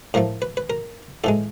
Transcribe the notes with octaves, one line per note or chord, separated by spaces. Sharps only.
A2 F3 A3 A#4
B4
B4
A#4
A2 E3 G#3 A4